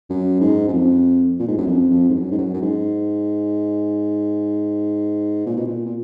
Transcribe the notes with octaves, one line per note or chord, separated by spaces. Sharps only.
F#2
G#2
F#2
F2
A#2
G#2
F#2
F2
F2
G#2
F#2
G#2
F#2
F#2
G#2
A#2
B2
A#2
A#2